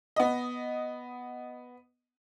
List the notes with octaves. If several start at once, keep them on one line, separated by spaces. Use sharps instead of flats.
B3 D#5